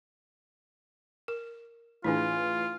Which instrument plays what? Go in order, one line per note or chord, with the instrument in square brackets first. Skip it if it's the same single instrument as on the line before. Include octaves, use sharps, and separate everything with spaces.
[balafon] A#4
[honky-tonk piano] A2 E3 G#4 [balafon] D4 E4 [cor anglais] F4